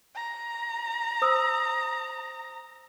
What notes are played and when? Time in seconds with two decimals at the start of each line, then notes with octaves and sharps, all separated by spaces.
0.15 A#5
1.22 C5 D#6 E6